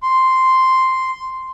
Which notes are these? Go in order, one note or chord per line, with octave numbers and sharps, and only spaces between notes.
C6